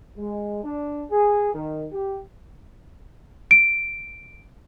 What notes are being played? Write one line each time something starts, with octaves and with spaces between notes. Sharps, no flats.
G#3
D4
G#4
D#3
G4
D7